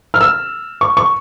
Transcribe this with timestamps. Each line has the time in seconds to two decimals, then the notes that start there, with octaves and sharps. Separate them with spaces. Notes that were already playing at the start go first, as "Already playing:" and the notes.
0.14 F6
0.21 E6
0.81 C#6
0.97 C#6